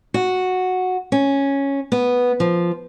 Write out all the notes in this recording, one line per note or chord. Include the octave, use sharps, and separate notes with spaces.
F#4
C#4
B3
F3